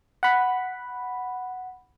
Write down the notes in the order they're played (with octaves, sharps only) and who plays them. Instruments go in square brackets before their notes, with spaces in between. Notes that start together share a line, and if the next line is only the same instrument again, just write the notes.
[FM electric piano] F#5 B5